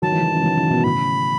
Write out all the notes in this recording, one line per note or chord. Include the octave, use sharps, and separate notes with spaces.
D#3 F#3 A5
E3 G#3
D#3 F#3
C#3 E3
D#3 F#3
C#3 E3
B2 D#3
A2 C#3 B5